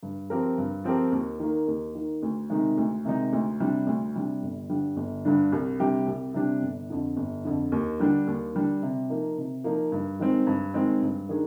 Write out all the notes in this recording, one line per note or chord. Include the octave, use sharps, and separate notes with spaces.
G2
F3 C4 G4 A#4
G2
F3 C4 G4 A#4
D#2
D#3 A#3
D#2
D#3 A#3
D2
C3 D#3 G#3 D#4
D2
C3 D#3 G#3 D#4
D2
C3 G3 D4
D2
C3 G3 D4
G1
G2 D3 G3 D4
G1
G2 D3 G3 D4
C2
C3 G3 D4 G4
C2
C3 G3 D4 G4
G1
F2 D3
G1
F2 D3
D#2
D3 G3 D4
D#2
D3 G3 D4
C3
F3 A#3 D#4
C3
F3 A#3 D#4
G2
D#3 G#3 C4
G2
D#3 G#3 C4
G2
D#3 A#3 D4 G#4